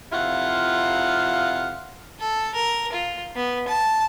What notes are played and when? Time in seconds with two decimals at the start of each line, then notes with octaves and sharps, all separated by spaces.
0.12 F2 C3 E4 F4 F5 F#5
2.19 A4
2.54 A#4
2.92 F4
3.35 B3
3.68 A5